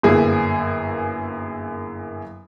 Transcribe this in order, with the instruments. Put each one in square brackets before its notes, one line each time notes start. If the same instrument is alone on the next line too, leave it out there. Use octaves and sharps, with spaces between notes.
[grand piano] G1 F#2 A#3 E4 G#4 G#5